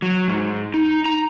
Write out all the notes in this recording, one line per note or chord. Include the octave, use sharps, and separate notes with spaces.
F#3
G#2
D#4
A#5